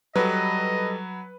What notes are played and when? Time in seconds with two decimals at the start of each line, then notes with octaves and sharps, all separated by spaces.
0.16 F#3 G3 A4 B4 D#5